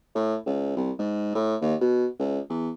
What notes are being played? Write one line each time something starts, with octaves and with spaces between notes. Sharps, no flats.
A2
C#2
C2
G#2
A2
D#2
B2
C#2
E2